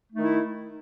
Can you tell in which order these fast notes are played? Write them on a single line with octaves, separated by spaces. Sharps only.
A3 D#4 D#3 E4